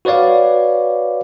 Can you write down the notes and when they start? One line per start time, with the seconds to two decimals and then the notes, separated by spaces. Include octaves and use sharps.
0.05 F#4 B4 C#5 D5 F5